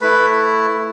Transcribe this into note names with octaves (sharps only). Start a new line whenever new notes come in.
A3 E4 B4 B5